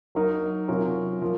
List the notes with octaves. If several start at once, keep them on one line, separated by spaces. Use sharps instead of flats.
F#3 A#3 D#4 A#4
C3 F#3 C#4 F4 A#4
F3 A#3